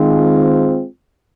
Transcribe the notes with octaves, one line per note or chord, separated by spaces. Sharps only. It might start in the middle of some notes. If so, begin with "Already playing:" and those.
Already playing: D#3 G#3 C4 F4